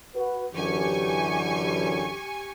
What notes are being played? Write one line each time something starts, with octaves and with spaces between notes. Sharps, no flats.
F#4 B4
F#2 D3 E3 G4 G#5 C#6